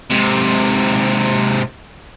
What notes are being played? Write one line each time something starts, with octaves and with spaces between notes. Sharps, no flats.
G#2 C3